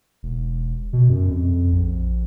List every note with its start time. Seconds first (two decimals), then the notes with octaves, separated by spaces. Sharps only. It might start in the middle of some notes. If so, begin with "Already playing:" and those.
0.23 E1
0.93 B2
1.09 F#2
1.30 F2
1.73 A#1